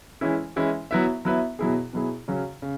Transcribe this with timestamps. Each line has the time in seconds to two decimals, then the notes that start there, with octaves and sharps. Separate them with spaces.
0.21 E3 G#3 C#4 E4
0.56 E3 G#3 C#4 E4
0.91 F#3 B3 E4 B4 E5
1.25 F#3 B3 E4 B4 E5
1.59 B2 F#3 E4 G#4
1.93 B2 F#3 E4 G#4
2.28 C#3 F#3 C#4
2.62 C#3